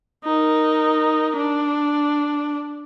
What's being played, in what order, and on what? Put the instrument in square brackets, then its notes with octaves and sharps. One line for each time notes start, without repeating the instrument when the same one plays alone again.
[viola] D#4 A#4
D4